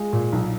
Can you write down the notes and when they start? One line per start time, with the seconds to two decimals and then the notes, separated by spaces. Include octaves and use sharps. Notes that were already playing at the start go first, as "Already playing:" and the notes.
Already playing: G#3 F4
0.13 A#2
0.33 B1